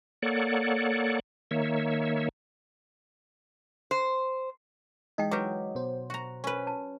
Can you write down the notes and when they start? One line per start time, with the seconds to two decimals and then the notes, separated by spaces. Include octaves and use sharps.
0.23 A#3 A4 C#5 D5 F#5
1.51 D#3 A#3 C#5 E5
3.91 C5
5.18 E3 G#3 D#4 D#5 G5
5.31 F#3 G4 B4 D6
5.75 B2 C5
6.10 F#4 A#5
6.44 C#4 B4
6.67 A5